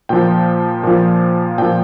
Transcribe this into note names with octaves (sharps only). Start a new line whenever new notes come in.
A#2 F3 G5
A#2 F3
A#2 F3 G5